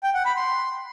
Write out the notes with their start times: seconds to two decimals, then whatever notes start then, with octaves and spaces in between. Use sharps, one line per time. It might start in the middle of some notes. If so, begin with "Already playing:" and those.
0.03 G5
0.14 F#5
0.25 B5
0.36 C6